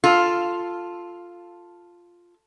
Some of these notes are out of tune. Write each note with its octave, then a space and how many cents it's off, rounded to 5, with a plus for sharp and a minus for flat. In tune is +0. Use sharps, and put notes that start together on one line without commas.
F4 +0 A4 +5